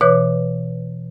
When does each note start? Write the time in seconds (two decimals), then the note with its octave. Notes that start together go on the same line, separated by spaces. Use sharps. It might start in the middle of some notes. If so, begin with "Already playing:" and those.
0.01 B2 E3 B4 C#5 D6 F#6